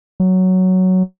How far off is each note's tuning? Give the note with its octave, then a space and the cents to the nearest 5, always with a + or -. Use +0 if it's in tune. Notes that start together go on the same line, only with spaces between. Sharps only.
F#3 +5